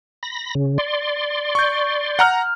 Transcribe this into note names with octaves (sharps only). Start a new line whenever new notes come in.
B5 A#6
C#3
D5 C6
C#6 G6
F#5 A#5 F6